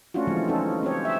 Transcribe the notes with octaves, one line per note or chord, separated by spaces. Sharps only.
A3 C#4 D4 F4 F#4
D3 E3 F3 G3 G#3 C4
C#4 D#4 F4 A4
C4 G4 C#5
E5